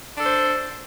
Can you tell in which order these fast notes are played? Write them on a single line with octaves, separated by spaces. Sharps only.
D4 A4 C5